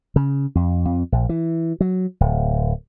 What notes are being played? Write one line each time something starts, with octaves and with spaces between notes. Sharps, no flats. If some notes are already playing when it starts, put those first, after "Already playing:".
C#3
F2
F2
A#1
E3
F#3
D1